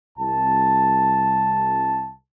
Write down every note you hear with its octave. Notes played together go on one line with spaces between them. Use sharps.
C2 A5